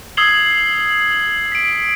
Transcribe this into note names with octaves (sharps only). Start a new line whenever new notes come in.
D#6 E6 G#6 C7 F#7 G7
B6 D7